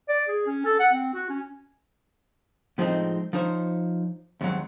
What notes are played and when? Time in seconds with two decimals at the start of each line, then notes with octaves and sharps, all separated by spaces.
0.09 D5
0.29 G#4
0.47 C#4
0.65 A4
0.80 F#5
0.92 C4
1.14 F#4
1.30 C#4
2.78 A2 F3 G#3 B3 C4 D#4
3.33 F3 D#4 C5 C#5
4.41 D#2 G#2 F#3 C4